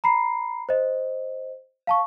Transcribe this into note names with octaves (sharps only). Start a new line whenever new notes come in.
A#5 B5 C7
C5 D#5
F5 A5 C#6